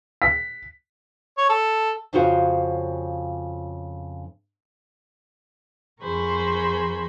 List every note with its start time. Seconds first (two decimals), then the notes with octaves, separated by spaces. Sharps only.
0.22 B6
1.37 C#5
1.49 A4
2.13 F2 C#3 F4 F#4 C5 F5
6.02 F2 G#4 A#4 C5 B5 C#6